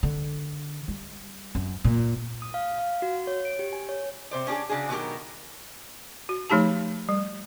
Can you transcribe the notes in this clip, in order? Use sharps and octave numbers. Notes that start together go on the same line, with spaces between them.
D3
G3
F#2
A#2
D#6
F5
F5
F#4
C#5
D7
G4
G#5
C#5
C3 C5 D5
C#4 D4 G4 G#4
C#3 D4 F#4 G#4
B2 D#3 F#3 C#4 G4 A#4
F#4
F3 A3 D#4 G4 A5
G3